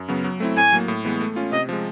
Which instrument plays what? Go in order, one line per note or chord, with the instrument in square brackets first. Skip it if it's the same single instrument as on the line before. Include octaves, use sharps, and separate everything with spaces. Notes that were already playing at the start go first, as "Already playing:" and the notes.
Already playing: [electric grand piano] F#2
C#3 F#3 B3
F#3
A3 C4 E4
[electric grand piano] A2 [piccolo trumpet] G#5
[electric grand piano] F#3 A#3
A2
E3 G#3 B3
A3
C#4 F4
[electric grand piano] C3 [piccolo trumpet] D#5
[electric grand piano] F3 G#3